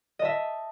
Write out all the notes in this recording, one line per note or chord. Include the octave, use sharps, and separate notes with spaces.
D#5 E5 A5